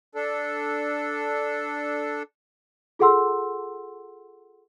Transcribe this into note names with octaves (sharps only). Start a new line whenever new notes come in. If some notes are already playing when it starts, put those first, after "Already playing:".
D4 A4
F4 G#4 A4 F#5 C6 E6